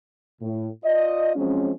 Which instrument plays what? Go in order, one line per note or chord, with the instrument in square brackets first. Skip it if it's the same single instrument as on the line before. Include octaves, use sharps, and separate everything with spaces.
[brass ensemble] A2
F4 D5 D#5
F3 F#3 G#3 C4 C#4